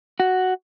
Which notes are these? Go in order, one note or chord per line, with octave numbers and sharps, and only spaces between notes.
F#4